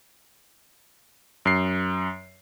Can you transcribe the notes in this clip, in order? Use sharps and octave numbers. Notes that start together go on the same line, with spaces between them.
F#2 C7